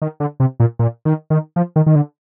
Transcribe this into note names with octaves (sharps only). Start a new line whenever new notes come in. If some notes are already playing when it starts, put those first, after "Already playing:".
D#3
D3
C3
A#2
A#2
D#3
D#3
F3
D#3
D#3
D3